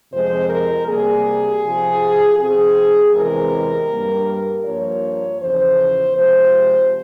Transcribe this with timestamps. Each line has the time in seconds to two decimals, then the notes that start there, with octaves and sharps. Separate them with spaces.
0.12 F2 C3 F3 G#3 C4 C5
0.49 A#4
0.87 C3 G3 A#3 G#4
1.63 C3 F3 C4
2.38 C3 F3 C4 G#4
3.14 E2 C3 E3 G#3 C4 A#4
3.90 G2 G3 A#3
4.66 G2 F3 A#3 C#5
5.41 E2 C#3 F3 C5
6.17 C3 F3 G#3 C5